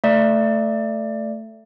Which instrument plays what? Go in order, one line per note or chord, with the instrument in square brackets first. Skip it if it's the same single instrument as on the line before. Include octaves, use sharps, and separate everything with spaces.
[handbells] A3 D5